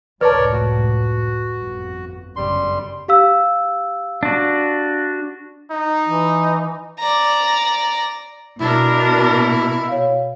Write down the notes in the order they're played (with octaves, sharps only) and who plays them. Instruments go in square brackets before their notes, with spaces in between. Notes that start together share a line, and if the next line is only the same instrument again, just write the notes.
[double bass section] F1 C#2 A2 [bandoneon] A#4 C#5 D5 [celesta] B4 A5
[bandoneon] F#4
[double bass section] G1 F2
[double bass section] G1 F#2 C#3 [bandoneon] G3 C6
[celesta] G4 F5 E6
[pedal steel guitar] D4 F#4
[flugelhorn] D#4
[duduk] E3
[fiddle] D5 A#5
[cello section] B2 [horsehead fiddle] D4 A#4 [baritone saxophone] E4
[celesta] C#5 F5